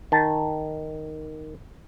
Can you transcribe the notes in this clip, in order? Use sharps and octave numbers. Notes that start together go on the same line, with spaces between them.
D#3 A5